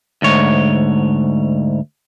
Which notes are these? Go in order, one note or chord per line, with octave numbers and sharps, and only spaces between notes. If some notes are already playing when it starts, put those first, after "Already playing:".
D2 G#2 C#5